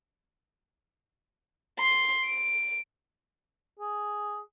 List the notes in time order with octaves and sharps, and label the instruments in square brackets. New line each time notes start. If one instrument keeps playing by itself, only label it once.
[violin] C6
D7
[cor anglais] G#4